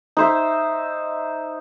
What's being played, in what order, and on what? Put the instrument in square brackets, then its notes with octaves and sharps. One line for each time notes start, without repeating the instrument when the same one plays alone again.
[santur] D#4 C5 E5